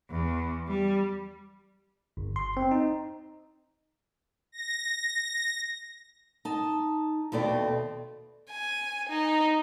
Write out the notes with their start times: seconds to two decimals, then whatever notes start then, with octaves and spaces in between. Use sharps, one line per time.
0.11 E2
0.68 G3
2.17 G1
2.36 C6
2.57 C4
2.71 D#4
4.52 A#6
6.45 D#4 A5
7.32 D#2 B2 A3 C4 D5
8.51 G#5
9.09 D#4